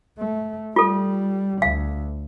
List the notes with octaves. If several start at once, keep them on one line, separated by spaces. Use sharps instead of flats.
A3
G3 F4 A4
D2 F5